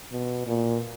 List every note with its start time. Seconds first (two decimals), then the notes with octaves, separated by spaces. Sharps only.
0.12 B2
0.47 A#2